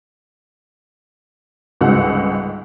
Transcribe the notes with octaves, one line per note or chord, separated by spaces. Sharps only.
G1 C#2 G#2 G#3 F#5